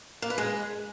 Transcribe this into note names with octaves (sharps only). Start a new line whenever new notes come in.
A#3
B4
G#3